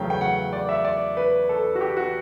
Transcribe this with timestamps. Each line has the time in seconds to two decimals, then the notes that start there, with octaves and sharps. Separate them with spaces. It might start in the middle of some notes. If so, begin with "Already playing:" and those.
Already playing: E2 C#3 F#3 A3 G5
0.10 G5
0.21 F#5
0.53 D5
0.69 E5
0.85 D5
1.17 B4
1.49 A4
1.75 F#4
1.81 G4
1.97 F#4